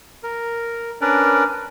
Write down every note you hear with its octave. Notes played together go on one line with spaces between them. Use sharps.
A#4
C#4 D4 A#4 B4 D5